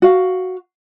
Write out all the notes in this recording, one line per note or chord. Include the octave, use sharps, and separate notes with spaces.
F#4 F5